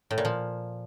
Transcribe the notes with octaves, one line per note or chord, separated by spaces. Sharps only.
A2
A#2
F3